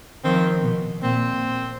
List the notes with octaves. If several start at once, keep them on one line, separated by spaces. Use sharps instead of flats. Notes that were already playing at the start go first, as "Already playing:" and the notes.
D#3 F3 C4
B2
A#2 C4